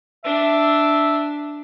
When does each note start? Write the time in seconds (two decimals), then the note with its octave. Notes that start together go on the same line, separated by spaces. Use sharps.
0.25 D4 E5